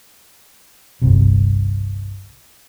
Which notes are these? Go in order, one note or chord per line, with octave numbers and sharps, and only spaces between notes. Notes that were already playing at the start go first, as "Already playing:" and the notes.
G1 C2 C3